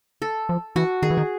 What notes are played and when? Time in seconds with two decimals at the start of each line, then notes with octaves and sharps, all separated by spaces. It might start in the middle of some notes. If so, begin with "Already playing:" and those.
0.22 A4
0.49 F3
0.76 E3 F#4
1.02 D#3 G#4
1.10 E3
1.18 D#3